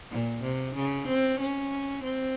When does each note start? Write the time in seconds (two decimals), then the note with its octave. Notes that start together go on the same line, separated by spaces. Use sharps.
0.11 A#2
0.42 C3
0.75 C#3
1.07 C4
1.39 C#4
2.03 C4